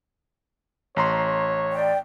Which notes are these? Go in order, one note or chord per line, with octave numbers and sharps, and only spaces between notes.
A1 C#5 A#5 C6
D5 G5